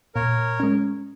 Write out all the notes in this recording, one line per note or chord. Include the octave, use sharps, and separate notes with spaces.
A#2 A#4 C#5
G#3 C#4